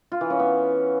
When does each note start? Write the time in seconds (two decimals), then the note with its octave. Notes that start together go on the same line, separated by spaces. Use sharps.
0.12 F4
0.21 E3
0.30 C#4
0.39 B3